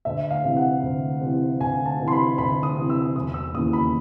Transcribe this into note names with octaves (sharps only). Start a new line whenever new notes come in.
D2 E5
F5
C3 E3
F#5
D2
C3 E3
D2 G#5
A5
C3 E3
C6
B5
D2 B5
D#6
C3 E3
E6
E1 D#6
E6
D#2 C#3 E3 D#6
B5